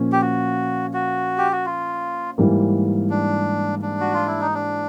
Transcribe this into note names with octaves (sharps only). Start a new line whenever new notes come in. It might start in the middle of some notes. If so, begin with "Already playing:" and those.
Already playing: A#2 F3 A#3 C#4
G4
F#4
F#4
G4
F#4
F4
G#2 E3 G3 A#3
D4
D4
F#4
F4
E4
D#4
D4